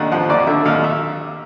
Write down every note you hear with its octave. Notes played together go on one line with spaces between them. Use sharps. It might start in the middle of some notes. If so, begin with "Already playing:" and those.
Already playing: D#2 D3 F#5
F3 F#5
D#2 D5
D3 E5
D#2 F5
E5